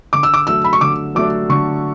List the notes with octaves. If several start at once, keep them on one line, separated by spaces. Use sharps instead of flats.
D3 D6
E6
D6
F#3 A3 D4 E6
B5
C#6
D3 D6
F#3 A3 D4 D6
D3 C#6